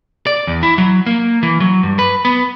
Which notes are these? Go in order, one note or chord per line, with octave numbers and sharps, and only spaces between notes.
D5
E2
E4
F#3
A#3
E3
F#3
G2
B4
B3